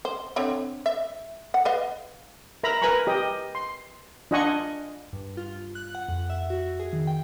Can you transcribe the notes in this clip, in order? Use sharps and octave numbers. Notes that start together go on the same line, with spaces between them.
C5
D3 C4 C#5
E5
F#5
B4 D#5 F5
A#4 E5 A#5 B5
A#4 B4 G#5 A#5 B5 C#6
G4 D#5
C6
D4 F4 D#5 F#5 G#5 C#6
G2
F4
F#6
F#5
F2
E5
F#4
G#4
D#3
G5